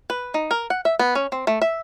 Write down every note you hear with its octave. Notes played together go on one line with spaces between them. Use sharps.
B4
D#4
A#4
F#5
E5
B3
C#4
C4
A3
E5